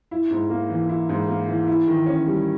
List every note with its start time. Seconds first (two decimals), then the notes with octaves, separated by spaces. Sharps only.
0.11 E4
0.31 G#2
0.50 A#3
0.70 E3
0.89 E4
1.09 G#2
1.28 A#3
1.48 E3
1.67 E4
1.87 D#3
2.06 C#4
2.27 G3